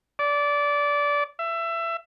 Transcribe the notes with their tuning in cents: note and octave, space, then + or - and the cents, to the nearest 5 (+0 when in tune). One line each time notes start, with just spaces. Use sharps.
D5 -20
E5 +25